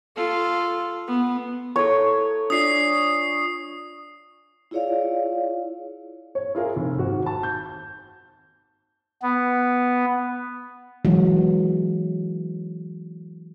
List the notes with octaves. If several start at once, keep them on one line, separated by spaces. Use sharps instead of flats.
F4 A4
B3
E4 A4 C#5
D4 F4 D5 D#6 C7
E4 F4 G#4 C#5 D5 F5
C#5
E4 F4 G#4 A#4
F1
G#1 F#4
A5
G6
B3
E3 F#3 G#3